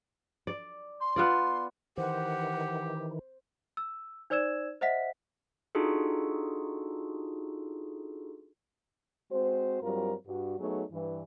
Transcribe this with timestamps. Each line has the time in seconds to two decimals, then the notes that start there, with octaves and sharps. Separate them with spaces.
0.47 D5
1.00 C6
1.16 B3 F4 D5
1.98 D#3 E3 G4 C5 F#5
3.77 E6
4.30 D#4 C5 D5 E6 G#6 E7
4.81 C5 D#5 E5 F#5 B6
5.75 D4 D#4 F4 F#4 G#4 A4
9.31 G#3 C4 F#4 C5
9.82 G2 F#3 G3 C4 F4 A#4
10.27 G2 F#4
10.59 F#3 A3 B3 D#4 G#4 C#5
10.92 G2 E3